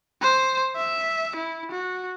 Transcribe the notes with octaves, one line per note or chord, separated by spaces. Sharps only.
C5
E5
E4
F#4